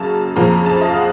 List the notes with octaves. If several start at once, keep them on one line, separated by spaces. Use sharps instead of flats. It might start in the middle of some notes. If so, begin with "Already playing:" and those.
Already playing: F#2 C#3 F#3 A#3 A5 A#5
F2 C#3 F3 A#3 A#5
A5
D#5
F5
F#5